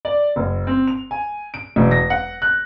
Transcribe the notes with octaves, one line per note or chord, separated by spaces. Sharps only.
D5
F#1
C4
F7
G#5
D7
E1
A#6
F#5
F#6